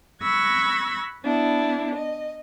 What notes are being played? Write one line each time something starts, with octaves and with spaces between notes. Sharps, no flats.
B5 C#6 E6 F#6 G#6 A#6
B3 D4 E4
D#5